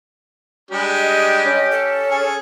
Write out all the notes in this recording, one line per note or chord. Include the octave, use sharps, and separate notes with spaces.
G3 G#3 D4 G4
D#5
C#4
A4
G#4